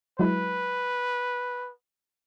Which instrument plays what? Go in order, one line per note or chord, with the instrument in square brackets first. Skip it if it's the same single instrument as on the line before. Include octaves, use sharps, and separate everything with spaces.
[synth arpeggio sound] F#3 G#3 E4 [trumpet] B4